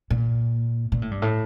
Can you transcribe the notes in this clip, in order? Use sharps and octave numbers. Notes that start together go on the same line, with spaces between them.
A#2
A#2
A2
G2
A2